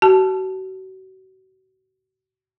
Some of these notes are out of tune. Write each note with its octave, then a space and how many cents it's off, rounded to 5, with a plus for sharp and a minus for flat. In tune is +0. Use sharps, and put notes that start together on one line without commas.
F#4 +35 A5 -10